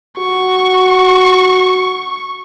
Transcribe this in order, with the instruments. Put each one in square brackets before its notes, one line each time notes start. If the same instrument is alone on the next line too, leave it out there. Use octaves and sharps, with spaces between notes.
[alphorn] F#4 [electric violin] C#6